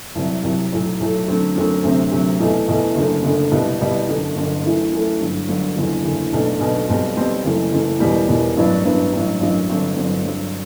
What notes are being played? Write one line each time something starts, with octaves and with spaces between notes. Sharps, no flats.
C2 C3 F#3
C2 C3 F#3
B1 A2 F#3 A3
B1 A2 F#3 A3
F#2 D3 F#3 A3 C4
F#2 D3 F#3 A3 C4
D2 C3 F#3 C4
D2 C3 F#3 C4
E2 B2 A3 E4
E2 B2 A3 E4
F#1 F#2 D3 A3
F#1 F#2 D3 A3
C2 B2 G3
C2 B2 G3
G1 F#2 D3
G1 F#2 D3
F#2 E3 A3 E4
F#2 E3 A3 E4
G1 G2 F#3
G1 G2 F#3
F#1 E2 D3
F#1 E2 D3
B1 B2 A3 D4
B1 B2 A3 D4
B1 B2 G3 C4
B1 B2 G3 C4
F#1 F#2 E3 A3
F#1 F#2 E3 A3
E1 E2 B2 G3
E1 E2 B2 G3
A1 G2 F#3 B3 D4
A1 G2 F#3 B3 D4
A1 G2 F#3
A1 G2 F#3
G1 G2 F#3 C4
G1 G2 F#3 C4
G2 D3 F#3